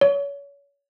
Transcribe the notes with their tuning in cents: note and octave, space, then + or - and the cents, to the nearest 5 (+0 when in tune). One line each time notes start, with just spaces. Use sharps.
C#5 +30